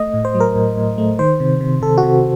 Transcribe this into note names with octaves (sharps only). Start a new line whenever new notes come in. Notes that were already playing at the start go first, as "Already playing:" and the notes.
Already playing: A3 D#5
A2
C5
F#3
A#4
A2
A2
A3
D#3 C5
C3
C3
C3 A4
F#4
C3